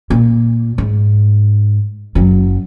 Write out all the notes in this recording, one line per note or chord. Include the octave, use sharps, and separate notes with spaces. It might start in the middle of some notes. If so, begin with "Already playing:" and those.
A#2
G#2
F#1 F#3